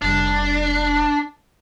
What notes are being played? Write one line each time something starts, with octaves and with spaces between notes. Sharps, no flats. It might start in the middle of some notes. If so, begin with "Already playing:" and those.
F1 G3 D4